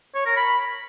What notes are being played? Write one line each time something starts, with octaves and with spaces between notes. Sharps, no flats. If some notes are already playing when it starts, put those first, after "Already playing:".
C#5
A#4
B5